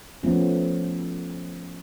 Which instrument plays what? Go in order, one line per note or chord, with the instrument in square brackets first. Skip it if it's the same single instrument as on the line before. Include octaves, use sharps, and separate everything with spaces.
[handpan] F3 A3 B3 C#4